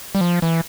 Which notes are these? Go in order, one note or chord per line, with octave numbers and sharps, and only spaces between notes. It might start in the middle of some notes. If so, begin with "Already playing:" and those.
G3
F3
E3